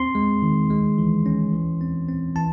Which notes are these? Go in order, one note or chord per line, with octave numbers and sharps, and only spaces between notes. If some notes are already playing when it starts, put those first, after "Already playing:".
Already playing: C4 C6
G#3
D#3
G#3
E3
C#4
E3
C4
C4
E3 A5